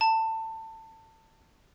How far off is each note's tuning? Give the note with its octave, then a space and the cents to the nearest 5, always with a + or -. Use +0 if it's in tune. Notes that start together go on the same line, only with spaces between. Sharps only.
A5 +25